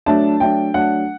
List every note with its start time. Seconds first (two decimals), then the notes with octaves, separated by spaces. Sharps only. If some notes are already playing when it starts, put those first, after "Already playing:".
0.06 F#3 A3 D4 A5
0.40 F#3 A3 D4 G5
0.74 F#3 A3 D4 F#5